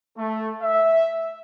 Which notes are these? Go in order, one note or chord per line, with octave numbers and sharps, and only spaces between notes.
A3
E5